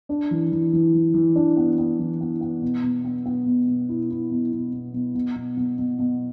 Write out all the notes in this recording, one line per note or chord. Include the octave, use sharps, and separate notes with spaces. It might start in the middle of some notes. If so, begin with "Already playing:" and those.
D4
E3
E3
E3
E3
E3
D4
B3
B3
E3
B3
B3
B2
B2
B3
B3
B2
B2
E4
E4
B2
B2
B2
B2
B2
B2
B2
B2
B2